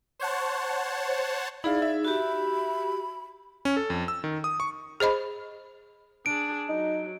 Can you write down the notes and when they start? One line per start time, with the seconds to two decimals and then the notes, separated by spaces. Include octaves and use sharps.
0.19 C5 C#5 F#5 A5
1.64 D#4 E4 G#4 D5 F5
1.82 E5
2.05 F#4 G4 B5
3.65 C#4
3.77 A4
3.90 F2
4.08 E6
4.24 D#3
4.44 D#6
4.60 C#6
5.00 G#4 C5 D#5 B5
6.26 D4 G#4 D7
6.69 F#3 D#4